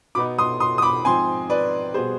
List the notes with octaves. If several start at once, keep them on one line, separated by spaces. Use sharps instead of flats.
B2 B3 D#4 B5 D6
C6 D#6
C6 D#6
D#6
B5 D6
G#2 F3 C4 G#5 C6
B4 D5
B2 G3 B3 G#4 C5